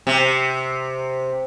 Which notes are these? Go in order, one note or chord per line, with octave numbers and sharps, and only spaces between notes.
C3